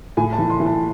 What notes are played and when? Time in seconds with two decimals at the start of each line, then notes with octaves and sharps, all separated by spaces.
0.17 A2 G#5
0.33 A5
0.38 E3
0.50 C6
0.60 E3
0.66 A5